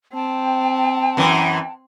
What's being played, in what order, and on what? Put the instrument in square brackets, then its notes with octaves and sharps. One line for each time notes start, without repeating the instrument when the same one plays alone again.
[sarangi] C4 [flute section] G5 A5
[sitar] F#2 E3